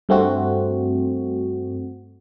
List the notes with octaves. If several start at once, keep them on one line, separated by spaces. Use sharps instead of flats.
G2 A3 C4 F#4